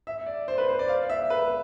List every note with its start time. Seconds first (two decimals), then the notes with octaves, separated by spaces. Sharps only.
0.07 E5
0.26 D5
0.48 C5
0.58 B4
0.69 C5
0.79 D5
0.89 F5
1.10 E5
1.30 B4